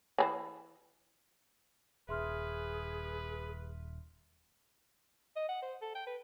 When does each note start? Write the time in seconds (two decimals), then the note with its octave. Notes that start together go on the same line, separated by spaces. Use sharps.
0.18 E3 G#4 C5
2.09 D#1 G#4 B4 E5 C6 F6
5.36 D#5
5.49 F#5
5.62 C5
5.82 A4
5.95 G5
6.06 B4